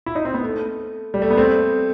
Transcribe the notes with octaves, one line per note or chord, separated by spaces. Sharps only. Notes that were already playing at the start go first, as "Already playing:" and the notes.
E4
D#4
C4
B3
A3
G3
A3
B3
A3 C4